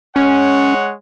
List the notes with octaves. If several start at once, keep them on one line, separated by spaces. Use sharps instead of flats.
G#3 C#4 C#5 F#5